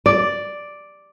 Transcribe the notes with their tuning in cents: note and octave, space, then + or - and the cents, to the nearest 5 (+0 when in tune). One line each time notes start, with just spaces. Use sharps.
D5 +0